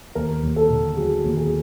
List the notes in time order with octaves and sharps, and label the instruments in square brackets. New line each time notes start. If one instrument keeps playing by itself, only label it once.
[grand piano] D#2 A#4
D#2
A4
D3
F#3 G#4
D#2
G#4